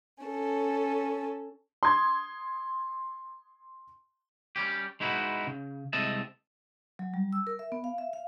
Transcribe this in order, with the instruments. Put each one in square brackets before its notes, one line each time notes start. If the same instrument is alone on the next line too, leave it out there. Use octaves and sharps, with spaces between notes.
[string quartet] C#4 A4
[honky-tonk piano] C6 D#6 G#6
[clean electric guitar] G3 C#4 G4
G#3 D#4 E4 F#4 B4
C#3
C2 G#3 C4 D#5 E5 A5
[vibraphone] F#3
G3
E6
A#4
E5
B3
F5
E5
F5